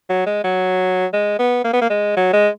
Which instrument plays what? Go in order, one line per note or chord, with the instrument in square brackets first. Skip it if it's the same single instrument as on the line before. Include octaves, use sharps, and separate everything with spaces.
[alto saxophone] F#3
G#3
F#3
G#3
B3
A#3
B3
A#3
G#3
F#3
G#3